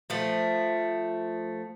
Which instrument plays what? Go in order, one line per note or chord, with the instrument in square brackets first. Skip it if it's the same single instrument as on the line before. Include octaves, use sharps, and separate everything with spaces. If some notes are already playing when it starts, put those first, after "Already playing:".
[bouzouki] F3 A3